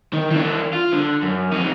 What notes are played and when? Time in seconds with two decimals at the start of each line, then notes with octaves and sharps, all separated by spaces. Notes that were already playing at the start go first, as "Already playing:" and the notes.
0.13 D#3
0.31 E3 D4
0.73 F4
0.93 D3
1.22 F#2
1.52 F2 D#4